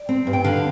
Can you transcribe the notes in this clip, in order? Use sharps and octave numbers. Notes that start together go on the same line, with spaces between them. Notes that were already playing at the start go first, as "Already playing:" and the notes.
Already playing: D5
C4
G2
G5
D3 F5